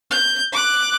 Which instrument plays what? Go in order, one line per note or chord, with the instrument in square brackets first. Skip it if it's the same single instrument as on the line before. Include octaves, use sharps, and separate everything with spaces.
[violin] G6
D6 F#6